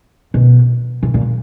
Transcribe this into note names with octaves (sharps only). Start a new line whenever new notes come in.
B2
B2
A#2